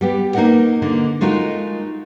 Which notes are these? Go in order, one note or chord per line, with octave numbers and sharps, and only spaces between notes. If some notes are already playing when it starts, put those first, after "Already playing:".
G3 B3 G4
A#3 D#4 A#4 D#5 F#5
D3 A#3 D#5
G#3 A3 D#4 F4 F#4 A#4